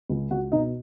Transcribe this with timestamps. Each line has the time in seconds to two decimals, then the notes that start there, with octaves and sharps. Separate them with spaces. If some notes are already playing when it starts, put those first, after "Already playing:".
0.10 C#2
0.31 C#2 F#4 F#5
0.52 B2 D#4 D#5